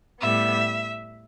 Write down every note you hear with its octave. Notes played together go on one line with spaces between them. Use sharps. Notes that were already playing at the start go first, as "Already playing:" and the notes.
A2 G3 B3 E5